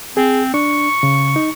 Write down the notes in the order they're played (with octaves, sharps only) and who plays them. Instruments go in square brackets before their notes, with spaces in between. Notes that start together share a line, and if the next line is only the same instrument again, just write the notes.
[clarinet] C4 [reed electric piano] G#4
[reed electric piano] D4 [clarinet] C#6
[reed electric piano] C#3
D#4